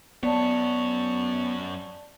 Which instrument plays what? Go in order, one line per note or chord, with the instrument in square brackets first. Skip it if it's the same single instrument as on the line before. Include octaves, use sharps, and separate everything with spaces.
[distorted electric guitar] F#2 C#5 [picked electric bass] B3 [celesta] D5 A5